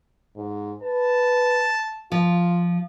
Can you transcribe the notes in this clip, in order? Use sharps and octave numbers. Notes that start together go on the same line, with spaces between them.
G#2
B4 A5
F3 F4